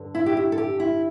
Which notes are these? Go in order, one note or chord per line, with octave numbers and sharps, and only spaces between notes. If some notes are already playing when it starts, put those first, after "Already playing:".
Already playing: G2 D3
E4
G4
E4
A4
G4
E4